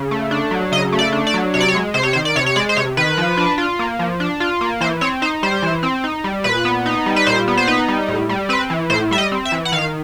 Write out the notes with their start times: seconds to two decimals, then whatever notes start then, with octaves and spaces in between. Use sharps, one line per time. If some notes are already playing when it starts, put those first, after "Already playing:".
Already playing: C#3
0.11 A3
0.31 D4
0.51 F#3
0.72 C#3 D#5
0.92 A3
0.99 D5
1.12 D4
1.27 D5
1.34 F#3
1.54 C3 C#5
1.60 D5
1.68 C#5
1.74 G#3
1.94 C3 C5
2.03 C#5
2.13 D#3 C5
2.25 D5
2.36 C3 C#5
2.46 C#5
2.56 G#3 D5
2.69 C5
2.76 C3 C#5
2.97 D#3 B4
3.17 F3
3.37 D4
3.58 F4
3.79 A#3
3.99 F3
4.20 D4
4.40 F4
4.61 A#3
4.81 E3 C5
5.01 C4 C#5
5.22 D#4 C5
5.43 G3 C5
5.62 E3
5.83 C4
6.04 D#4
6.24 G3
6.44 A#2 B4
6.65 B3
6.86 D#4
7.06 G3
7.16 B4
7.26 A#2 C5
7.48 B3
7.57 C5
7.67 D#4 B4
7.88 G3
8.08 A2
8.29 G3
8.49 C4 B4
8.70 E3
8.90 A2 C5
9.11 G3 E5
9.18 D#5
9.32 C4
9.45 E5
9.52 E3
9.65 F#5
9.72 D#3 F5